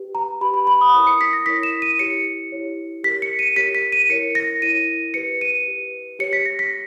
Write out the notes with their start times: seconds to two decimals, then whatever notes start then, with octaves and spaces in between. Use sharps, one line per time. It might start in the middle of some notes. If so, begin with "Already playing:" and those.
Already playing: G4 B4
0.15 A#5
0.41 G4 B5
0.44 B4
0.54 B5
0.67 B5
0.81 D#6
0.94 E4 A#4 C#5 D#6
1.07 C#7
1.21 B6
1.33 A#6
1.46 E4 A#4 C#5 B6
1.63 E7
1.82 D#7
1.99 E4 G4 C#5 C#7
2.52 E4 G4 C#5
3.04 G4 A#4 C#5 B6
3.22 C#7
3.39 D#7
3.56 G4 A#4 C#5 B6
3.75 B6
3.92 D#7
4.09 E4 A#4 C#5 C#7
4.35 A#6
4.62 E4 A#4 C#5 D#7
5.14 G4 B4 C#7
5.41 D#7
5.68 G4 B4
6.19 G4 C#5 C#7
6.33 B6
6.46 A#6
6.59 B6